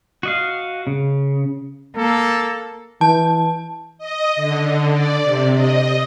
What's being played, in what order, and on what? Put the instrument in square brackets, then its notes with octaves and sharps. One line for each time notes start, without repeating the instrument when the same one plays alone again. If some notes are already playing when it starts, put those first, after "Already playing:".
[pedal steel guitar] F#4 D#5 F5
C#3
[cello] A#3 [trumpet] A4
[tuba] E3 [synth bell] A5
[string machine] D#5
D3
D5
C3
D#5